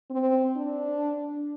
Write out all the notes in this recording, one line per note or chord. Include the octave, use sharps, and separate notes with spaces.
C4
D4